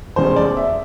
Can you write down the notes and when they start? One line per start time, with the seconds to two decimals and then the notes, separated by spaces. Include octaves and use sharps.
0.16 F1 E2 B2 G#3 C#4 C5
0.36 D5
0.57 E5